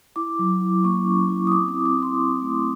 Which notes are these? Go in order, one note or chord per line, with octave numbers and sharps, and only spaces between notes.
E4 D6
F#3
E4
A#3 C#6
C#4
E4
D#6
C4 D6
D#6
C4
D6
C4
C6
C4
A3